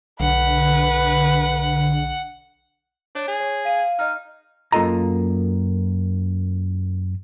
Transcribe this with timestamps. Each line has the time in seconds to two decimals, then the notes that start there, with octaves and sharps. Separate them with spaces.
0.20 B1 D3 B4 F#5
3.15 D4 C#5
3.28 G#4
3.40 C#5
3.65 F5 D#7
3.99 D#4 D#5 F6
4.72 F#2 A#3 F4 A4 D#5 A#5